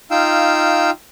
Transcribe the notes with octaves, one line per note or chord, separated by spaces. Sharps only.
D#4 F4 F5 G5 E6